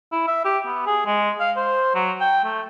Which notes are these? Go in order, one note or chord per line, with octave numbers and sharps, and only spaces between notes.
E4
E5
G4
B3
G#4
G#3
F5
C5
F#3
G5
A3